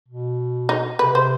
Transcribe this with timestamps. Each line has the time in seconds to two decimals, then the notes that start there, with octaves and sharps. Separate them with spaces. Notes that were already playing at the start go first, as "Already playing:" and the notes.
0.08 B2
0.69 D#4
0.99 C3 B4
1.15 C5